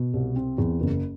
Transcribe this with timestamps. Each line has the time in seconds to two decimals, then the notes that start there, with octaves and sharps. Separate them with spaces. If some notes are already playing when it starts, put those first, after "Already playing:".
Already playing: B2
0.13 C2
0.36 C4
0.58 E2
0.81 F#1